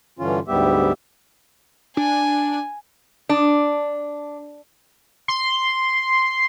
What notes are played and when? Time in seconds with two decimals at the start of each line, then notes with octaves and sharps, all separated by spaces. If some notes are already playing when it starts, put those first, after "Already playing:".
0.19 G2 D3 E3 C#4 F4
0.48 D2 G#2 G3 B3 G4 E5
1.97 D4 G#5
3.29 D4
5.28 C6